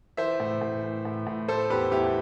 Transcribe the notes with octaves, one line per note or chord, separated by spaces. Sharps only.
E3 C5 E5
A2
A2
E3
A2
A2
A3 A4 C5
E2 G4 B4
E2 E4 G4